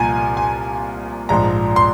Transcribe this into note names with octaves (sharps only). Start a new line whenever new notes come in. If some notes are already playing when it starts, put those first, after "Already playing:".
Already playing: C2 A#2 F3 G#5 A#5
G#5
A#1 G#2 F3 A#5
C6